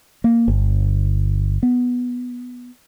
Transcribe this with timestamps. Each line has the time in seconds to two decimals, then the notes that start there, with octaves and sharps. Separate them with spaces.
0.24 A#3
0.48 G1
1.63 B3